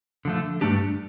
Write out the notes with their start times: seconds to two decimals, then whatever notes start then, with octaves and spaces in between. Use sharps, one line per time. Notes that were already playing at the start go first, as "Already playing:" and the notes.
0.25 D3 F3 A3
0.61 G2 F3 A3 D4 G4